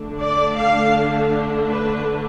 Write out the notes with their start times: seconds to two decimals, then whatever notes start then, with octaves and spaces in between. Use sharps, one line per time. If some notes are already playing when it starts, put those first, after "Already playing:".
Already playing: D3 A3 D4
0.21 D5
0.58 F5
1.68 B4